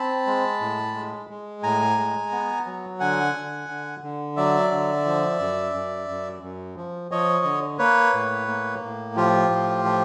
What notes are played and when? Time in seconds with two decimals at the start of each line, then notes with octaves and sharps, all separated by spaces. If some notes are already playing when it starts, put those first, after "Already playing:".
Already playing: C4 A5 B5
0.27 G#3
0.61 A2
0.94 G#3
1.30 G#3
1.63 A2 G#5 A#5
1.98 G#3
2.32 B3
2.66 F#3
3.00 D3 F#5 G#5
3.34 D3
3.69 D3
4.03 D3
4.37 F#3 D5 E5
4.71 D3
5.05 F3
5.39 F#2
5.74 F#2
6.09 F#2
6.42 F#2
6.76 F3
7.11 F3 C#5 D#5
7.45 D3
7.79 A#3 B4 C#5
8.14 A2
8.48 A#3
8.82 A2
9.16 F3 F4 G4
9.50 A2
9.85 F3